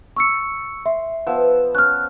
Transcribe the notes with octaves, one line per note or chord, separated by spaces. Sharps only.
C#6 E6 C#7
E5 C6
F3 B3 E6
C#4 F6 F#6